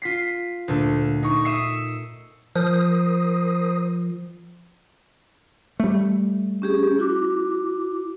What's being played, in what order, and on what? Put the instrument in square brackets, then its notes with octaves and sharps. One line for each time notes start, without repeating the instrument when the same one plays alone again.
[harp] F4 B6 C7
D2 A#2 A3
D#4 C#6
E5 D#6 E6 C7 C#7
[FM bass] F3 [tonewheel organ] A#4 C5 D#6
[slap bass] G3 A3
[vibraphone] C#4 G4 G#4
E4 F#4 D6